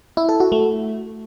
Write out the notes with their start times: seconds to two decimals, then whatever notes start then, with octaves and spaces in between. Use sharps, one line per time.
0.17 E4
0.29 A4
0.40 F#4
0.52 A3